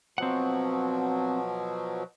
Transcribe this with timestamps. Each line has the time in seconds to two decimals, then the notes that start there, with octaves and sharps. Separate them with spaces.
0.18 B2 F3 F#3 C4 F#5